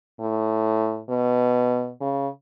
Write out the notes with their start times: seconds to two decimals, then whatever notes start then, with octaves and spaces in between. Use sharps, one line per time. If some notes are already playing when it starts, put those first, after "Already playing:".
0.20 A2
1.10 B2
2.01 C#3